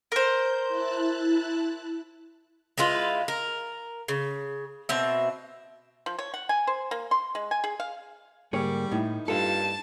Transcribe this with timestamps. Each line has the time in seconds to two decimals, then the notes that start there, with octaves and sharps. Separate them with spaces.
0.12 A#4 C5 G6
0.69 E4 A5 F#6
2.78 G#3 E4 F4 B4
3.28 A#4
4.08 C#3
4.89 B2 C4 E5
6.06 F3
6.19 C#5
6.34 F#5
6.49 G#5
6.67 C5
6.91 A#3
7.11 C6
7.35 G#3
7.51 G#5
7.64 G#4
7.80 F5
8.53 G#2 D3 G3 A#3 G#4 C#5
8.91 A2 A#3 D#4 E4
9.28 G2 F4 A4 A5